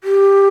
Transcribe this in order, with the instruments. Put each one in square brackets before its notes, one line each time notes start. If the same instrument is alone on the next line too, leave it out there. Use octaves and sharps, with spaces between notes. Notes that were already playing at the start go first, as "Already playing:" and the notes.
[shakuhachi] G4